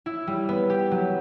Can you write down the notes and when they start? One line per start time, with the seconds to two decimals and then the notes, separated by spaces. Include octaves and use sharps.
0.06 E4
0.27 G3
0.49 B3
0.70 G4
0.91 F#3